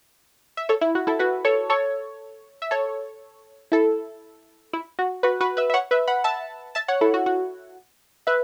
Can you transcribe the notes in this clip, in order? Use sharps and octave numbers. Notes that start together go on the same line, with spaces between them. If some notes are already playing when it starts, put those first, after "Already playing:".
E5
A4 C#5
E4
F#4
E4 A4
F#4 B4
A4 C#5
A4 C#5
E5
A4 C#5
E4 A4
E4
F#4
F#4 B4
F#4 B4
B4 E5
E5
C#5 F#5
B4 E5
F#5 B5
E5 A5
E5 A5
C#5 F#5
E4 A4
F#4
F#4
B4 E5